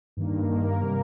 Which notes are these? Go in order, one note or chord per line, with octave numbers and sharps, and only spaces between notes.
G2 D#3 A#3
G2 D#3 A#3
A#4
C3 G3 A#3 A#4